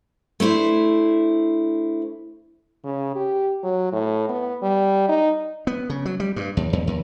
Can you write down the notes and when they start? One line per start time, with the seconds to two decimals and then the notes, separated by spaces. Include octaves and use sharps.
0.40 A3 D4 E4 C5
2.84 C#3
3.16 G4
3.64 F#3
3.93 A2
4.29 B3
4.62 G3
5.09 D#4
5.67 B3
5.90 C#3
6.05 F#3
6.20 G3
6.36 G2
6.57 D#2
6.73 E2
6.87 D#2